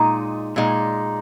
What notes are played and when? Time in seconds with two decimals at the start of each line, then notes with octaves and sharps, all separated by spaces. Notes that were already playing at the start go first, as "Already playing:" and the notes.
Already playing: A#2 G#3 D#4 A#5
0.56 A#2 G#3 D#4